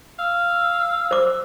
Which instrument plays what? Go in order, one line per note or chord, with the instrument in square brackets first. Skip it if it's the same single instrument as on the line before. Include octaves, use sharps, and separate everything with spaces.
[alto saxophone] F5 [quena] E6
[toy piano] C5 D6